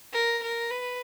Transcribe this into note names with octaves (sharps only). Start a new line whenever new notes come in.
A#4
A#4
B4